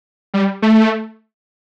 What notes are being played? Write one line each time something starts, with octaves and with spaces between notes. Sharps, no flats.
G3
A3